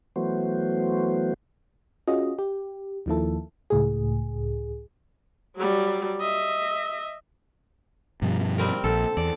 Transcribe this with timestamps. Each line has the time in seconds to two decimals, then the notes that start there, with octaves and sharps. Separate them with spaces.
0.16 E3 F#3 A3 B3 F#4 C5
2.08 C#4 F4 F#4 G#4 D#5
2.39 G4
3.06 D#2 D#3 F3 A#3 E4 A4
3.70 C#2 A2 G#4
5.56 F#3 G3
6.20 D#5 E5
8.22 G2 B2 F3
8.58 G3 C4 A#4
8.84 A#1 A4
9.17 E2 D5